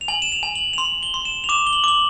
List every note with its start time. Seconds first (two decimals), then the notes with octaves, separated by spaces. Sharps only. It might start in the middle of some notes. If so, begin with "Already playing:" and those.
0.01 F7
0.08 G#5 F#7
0.22 E7
0.32 F7
0.43 G#5
0.55 F#7
0.73 F7
0.78 C6 F#7
1.03 G7
1.14 C6
1.25 E7
1.44 F7
1.49 D6 E7
1.67 G7
1.73 F#7
1.84 D6 F#7